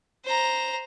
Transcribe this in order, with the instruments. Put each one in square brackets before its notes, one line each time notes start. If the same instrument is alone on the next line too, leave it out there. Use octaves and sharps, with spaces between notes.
[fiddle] C5 A#5